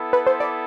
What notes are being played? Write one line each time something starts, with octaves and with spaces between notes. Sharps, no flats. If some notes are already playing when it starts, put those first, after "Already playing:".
Already playing: B3 E4 A4
B4
C5
D5